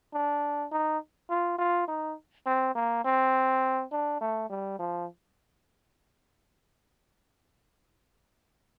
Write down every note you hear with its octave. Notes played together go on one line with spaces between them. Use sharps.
D4
D#4
F4
F4
D#4
C4
A#3
C4
D4
A3
G3
F3